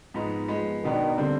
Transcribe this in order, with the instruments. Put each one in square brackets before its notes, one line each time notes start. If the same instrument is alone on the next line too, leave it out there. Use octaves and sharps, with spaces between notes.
[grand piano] G#2 F3 B3 D#4
F3 G#3 B3
[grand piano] B2 B3 D4 [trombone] D#3
[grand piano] D3 G3 C4